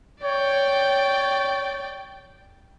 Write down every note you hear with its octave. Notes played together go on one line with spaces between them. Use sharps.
C#5 D5 G5